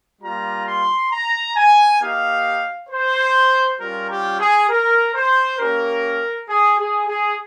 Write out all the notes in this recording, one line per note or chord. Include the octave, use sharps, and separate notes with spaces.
G3 A#3 F4 A#5
C6
A#5
G#5
A#3 D#4 G4 F5
C5
G3 C#4 F4 A#4
G4
G#4
A#4
C5
A#3 C#4 G4 A#4
G#4
G#4
G#4